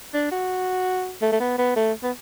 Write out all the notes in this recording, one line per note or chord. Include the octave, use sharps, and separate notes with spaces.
D4
F#4
A3
A3
B3
B3
A3
B3